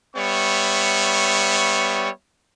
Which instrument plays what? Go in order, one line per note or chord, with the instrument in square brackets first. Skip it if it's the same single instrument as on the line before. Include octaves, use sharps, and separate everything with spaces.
[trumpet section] G3 B3 C#5 E5 C#6